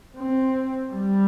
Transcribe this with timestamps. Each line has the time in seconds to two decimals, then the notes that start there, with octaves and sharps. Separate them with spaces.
0.18 C4
0.93 G3